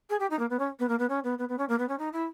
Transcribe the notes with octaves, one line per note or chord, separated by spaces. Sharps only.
G#4
G4
D#4
A#3
B3
C#4
B3
A#3
B3
C#4
B3
B3
B3
C#4
A#3
B3
C#4
D#4
E4